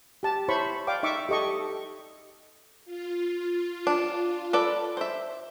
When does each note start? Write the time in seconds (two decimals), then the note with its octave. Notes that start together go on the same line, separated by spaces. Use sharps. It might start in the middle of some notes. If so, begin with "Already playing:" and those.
0.23 G4 A5
0.48 E4 C5 C#5 B5 C#6
0.87 D5 F5 G5 D6
1.03 D#4 E5 C#6 D6
1.29 G4 A4 D#5 C#6
2.85 F4
3.87 D4
4.53 A4 B4 D5
4.97 C5 E5